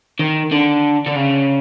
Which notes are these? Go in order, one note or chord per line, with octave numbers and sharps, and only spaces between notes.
D#3
D3
D3
C#3